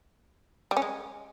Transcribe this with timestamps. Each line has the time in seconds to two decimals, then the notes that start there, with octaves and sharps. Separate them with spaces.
0.71 G3
0.77 C#4
0.82 G#3